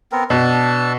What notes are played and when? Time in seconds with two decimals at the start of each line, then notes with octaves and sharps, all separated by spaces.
0.12 B3 C4 A#4
0.30 B2 D4 A5 E6